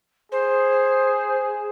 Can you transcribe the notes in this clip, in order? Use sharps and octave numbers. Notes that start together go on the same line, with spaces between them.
G#4 C5